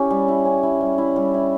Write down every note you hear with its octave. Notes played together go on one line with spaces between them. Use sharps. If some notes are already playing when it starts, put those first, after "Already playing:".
Already playing: C#4 E4 G4
G3
E4
C#4
E4
G3
E4
G3
E4